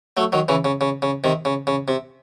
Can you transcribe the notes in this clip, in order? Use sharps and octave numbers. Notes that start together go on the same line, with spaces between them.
F#3 A3
D#3 F#3
C#3 E3
C#3
C#3
C#3
C3 D#3
C#3
C#3
C3